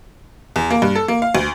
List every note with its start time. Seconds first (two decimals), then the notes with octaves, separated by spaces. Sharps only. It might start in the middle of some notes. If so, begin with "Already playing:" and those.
0.56 E2
0.71 A#3
0.82 G2
0.95 A4
1.08 A#3
1.22 F5
1.35 D2